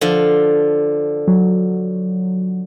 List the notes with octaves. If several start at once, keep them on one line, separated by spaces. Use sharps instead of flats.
D3 F3
F#3